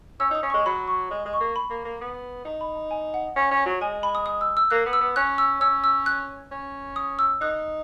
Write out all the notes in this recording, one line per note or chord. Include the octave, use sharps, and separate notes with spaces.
C#4 E6
D#4 D#6
C#4
C#6
G#3
F#3 B5
C#6
G#3
G#3
C#6
A#3
B5
A#3
A#3
B3
D#4 A#5
B5
A#5
G#5
F#5
C#4
C#4
F#3
G#3 G#5
B5
D#6
D#6
E6
E6
A#3 F#6
B3
E6
B3
C#4 F#6
E6
C#4 E6
E6
F#6
C#4
D#6
E6
D#4 F#6